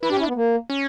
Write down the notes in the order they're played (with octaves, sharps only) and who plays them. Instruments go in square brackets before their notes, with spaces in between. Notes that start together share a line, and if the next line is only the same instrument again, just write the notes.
[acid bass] E4 [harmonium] B4
[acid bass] D4 [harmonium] G4
[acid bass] C#4 [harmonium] E4
[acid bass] D4
[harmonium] B3
A#3
[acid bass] C#4